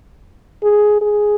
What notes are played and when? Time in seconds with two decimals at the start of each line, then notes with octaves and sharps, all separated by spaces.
0.63 G#4
1.01 G#4